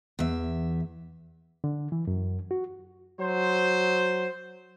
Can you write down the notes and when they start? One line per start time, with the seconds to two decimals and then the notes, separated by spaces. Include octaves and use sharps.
0.19 E2 E5
1.64 D3
1.92 E3
2.07 F#2
2.51 F#4
3.19 F#3 C5